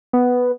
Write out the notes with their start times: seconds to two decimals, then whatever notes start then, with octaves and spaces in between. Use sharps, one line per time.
0.13 B3